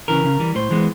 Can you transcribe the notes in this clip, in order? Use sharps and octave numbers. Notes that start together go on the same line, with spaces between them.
C#3 E3 A#4
C#3
E3 G3
A2 C5
E3 G#3 B3